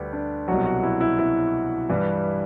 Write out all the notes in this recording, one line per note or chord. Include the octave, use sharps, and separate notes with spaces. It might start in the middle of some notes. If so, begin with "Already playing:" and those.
Already playing: D2 D3 G3 G4 B4
D4
C2 B2 F#3 F#4
F#4
E4
E4
E4
G2 E3 G3